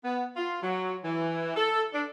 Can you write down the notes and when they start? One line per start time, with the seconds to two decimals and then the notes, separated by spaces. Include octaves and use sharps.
0.04 B3
0.36 F4
0.62 F#3
1.04 E3
1.56 A4
1.93 D4